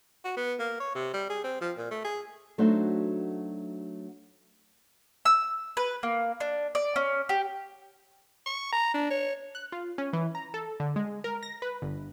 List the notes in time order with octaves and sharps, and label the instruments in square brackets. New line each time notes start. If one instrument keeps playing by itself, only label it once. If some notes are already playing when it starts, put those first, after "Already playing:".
[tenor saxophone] F#4
B3
A#3
C#5
C3
G3
G#4
C4
F3
A#2
A3
G#4
[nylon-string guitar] F#3 A3 D4 D#4 F#4 C5
[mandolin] E6
B4
A#3
D4
D5
C#4
G4
[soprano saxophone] C#6
A#5
D4
C#5
[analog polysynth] F#6
F4
C#4
E3
A#5
A4
D3
G#3
A#4
A#6
B4
G1